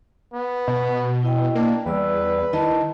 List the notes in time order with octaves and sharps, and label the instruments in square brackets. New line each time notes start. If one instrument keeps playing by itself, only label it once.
[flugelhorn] B3
[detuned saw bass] B2 [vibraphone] B4
[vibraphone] E4 D#5 G5
[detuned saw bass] A#3 [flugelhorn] D4
[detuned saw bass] E2 [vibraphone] G3 D5 E6 [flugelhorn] B4
[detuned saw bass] D#3 [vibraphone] E4 D#5 A5